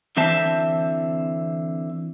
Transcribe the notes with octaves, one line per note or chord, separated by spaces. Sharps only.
D3 E3 C4 C5 E5 A5